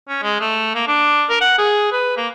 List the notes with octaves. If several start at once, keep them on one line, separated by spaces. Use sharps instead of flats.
C#4
G#3
A3
A#3
D4
A#4
F#5
G#4
B4
A#3